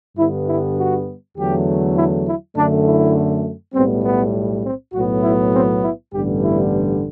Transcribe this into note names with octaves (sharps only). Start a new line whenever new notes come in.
G2 D3 G3 B3 E4
E4
F#4
E2 D3 F#3 A3 G4
E4
E4
F#2 D3 A3 D4
E4
B1 A2 G3 B3 C4
B3
C4
B1 A2 F#3 B3 F#4
E4
C4
E4
A1 G2 D3 G3 B3 G4
E4